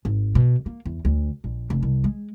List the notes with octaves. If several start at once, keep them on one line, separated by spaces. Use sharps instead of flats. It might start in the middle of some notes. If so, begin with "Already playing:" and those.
G#1
B2
A#3
E2
D2
A#1
F1
C2
G#3